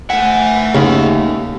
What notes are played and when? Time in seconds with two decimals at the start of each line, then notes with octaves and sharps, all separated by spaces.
0.10 A3 E5 F#5 G#5
0.75 D#2 C#3